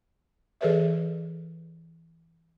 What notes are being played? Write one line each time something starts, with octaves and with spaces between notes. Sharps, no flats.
E3 G#4 A4 B4 C#5 E5